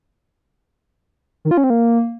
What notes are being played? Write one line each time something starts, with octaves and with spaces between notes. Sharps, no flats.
D#3
F4
C#4
C4
A#3